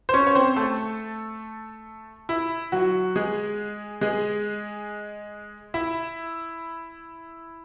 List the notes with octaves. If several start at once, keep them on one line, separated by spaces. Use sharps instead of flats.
C5
C#4 C#5
C#5
C4 C5
A3 A4
E4
F#3 F#4
G#3 G#4
G#3 G#4
E4 E5